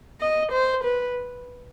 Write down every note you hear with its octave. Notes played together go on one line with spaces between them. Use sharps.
D#5
C5
B4